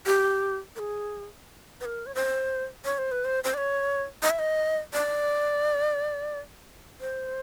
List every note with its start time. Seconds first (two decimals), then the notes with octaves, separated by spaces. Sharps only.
0.07 G4
0.76 A#4
0.79 G#4
1.81 B4
1.85 A#4
2.06 C#5
2.15 C5
2.85 C#5
2.98 C5
3.12 B4
3.25 C5
3.44 C5
3.54 D5
3.58 C#5
4.23 D#5
4.30 E5
4.39 D#5
4.93 D5
7.01 C5